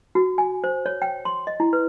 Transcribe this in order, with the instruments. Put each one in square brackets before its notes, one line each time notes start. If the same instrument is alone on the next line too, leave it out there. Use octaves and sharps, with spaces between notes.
[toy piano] F#4
G#5
C5
C#5
G5
C6
D#5
E4
B4